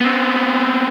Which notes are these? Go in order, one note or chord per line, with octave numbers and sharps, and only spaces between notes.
B3 C4